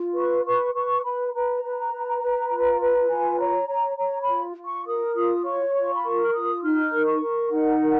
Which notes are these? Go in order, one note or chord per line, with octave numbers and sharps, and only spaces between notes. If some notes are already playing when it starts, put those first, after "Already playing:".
Already playing: F4
B4 C#6
B4 C#6
B4 C#6
B4 B5
B5
B4 A#5
B4
B4
B4
F4
B4
F4 G#5
C#5 A#5
C#5 A#5
C#5 A#5
B5
F4
F4
C#6
A#4 D#6
F4 D#6
C#5 C#6
F4 C#6
B5
A#4 C#6
F6
F4 D#6
D#4 F6
A#4
C#6
A#4
D#4 F#5
A#4